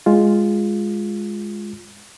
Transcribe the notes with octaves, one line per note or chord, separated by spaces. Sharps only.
G#3 F4